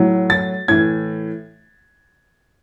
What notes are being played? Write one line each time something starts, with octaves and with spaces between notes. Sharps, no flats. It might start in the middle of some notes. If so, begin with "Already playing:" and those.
Already playing: A2 F#3
A6
A2 E3 G#6